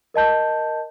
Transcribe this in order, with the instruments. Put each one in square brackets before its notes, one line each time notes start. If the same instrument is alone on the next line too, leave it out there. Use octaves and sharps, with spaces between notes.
[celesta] A#4 D#5 A5 G6